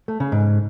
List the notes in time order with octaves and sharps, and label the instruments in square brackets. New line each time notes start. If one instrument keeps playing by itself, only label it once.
[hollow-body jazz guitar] A3
C#3
G#2